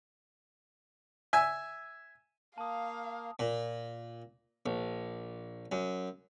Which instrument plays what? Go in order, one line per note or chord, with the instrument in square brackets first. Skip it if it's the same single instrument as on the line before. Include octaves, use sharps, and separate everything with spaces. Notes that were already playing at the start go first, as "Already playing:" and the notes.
[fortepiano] E5 G#5
[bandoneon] A#3 [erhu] F5 [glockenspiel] A5 D#6
[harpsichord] A#2
A#1
F#2